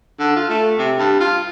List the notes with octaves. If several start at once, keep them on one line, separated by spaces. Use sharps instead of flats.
D3
F4
A3
C3
G2
F4